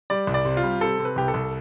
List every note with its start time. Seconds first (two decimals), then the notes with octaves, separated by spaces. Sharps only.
0.10 G3 D5
0.27 C2
0.34 D5
0.45 C3
0.57 F4
0.63 G3
0.81 C3 A4
0.99 C3
1.05 B4
1.16 C2 G4
1.28 A4
1.34 C2